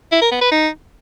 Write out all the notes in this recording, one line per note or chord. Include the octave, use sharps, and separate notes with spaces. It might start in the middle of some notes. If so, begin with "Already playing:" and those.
E4
A#4
B3
B4
D#4